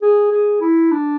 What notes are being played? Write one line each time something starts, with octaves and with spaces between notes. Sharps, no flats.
G#4
G#4
E4
D4